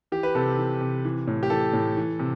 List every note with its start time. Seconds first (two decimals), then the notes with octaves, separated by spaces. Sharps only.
0.12 E3 G4
0.23 B4
0.35 C3 A4
0.58 E3
0.81 C3
1.05 E3
1.27 A2
1.43 G4
1.50 E3 A4
1.73 A2
1.97 E3
2.19 C3